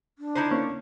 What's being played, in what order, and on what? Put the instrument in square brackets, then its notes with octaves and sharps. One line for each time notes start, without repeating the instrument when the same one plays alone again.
[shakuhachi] D4
[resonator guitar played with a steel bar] D3 D#4 E4 [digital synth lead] C5
[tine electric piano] A#3 [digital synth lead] C#4